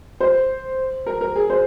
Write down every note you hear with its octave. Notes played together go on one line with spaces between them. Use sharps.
C5
A#4
A#4
G#4
C5